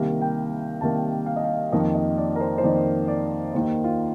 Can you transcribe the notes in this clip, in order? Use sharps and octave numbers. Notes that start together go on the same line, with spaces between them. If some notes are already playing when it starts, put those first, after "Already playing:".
Already playing: C2 C3 D#3 A#3
G5
C2 C3 D#3 A#3 A5
F5
D#5
F5
F2 D#3 A#3 D#4 D#5
D#5
D5
A#4
C5
C5
F2 D#3 A#3 D#4 D5
D5
D#2 D#3 A#3 D#4 C5
F4